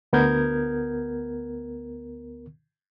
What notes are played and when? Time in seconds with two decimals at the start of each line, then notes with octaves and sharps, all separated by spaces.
0.13 D2 B3 A#4 G6 G#6